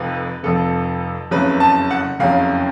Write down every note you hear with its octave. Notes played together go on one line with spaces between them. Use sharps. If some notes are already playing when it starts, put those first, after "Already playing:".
Already playing: F1 F2 F3 B4
F1 F2 F3 A4
F#1 F2 C#3 F#3 B4
A5
F#5
F#1 F2 C#3 F#3 F5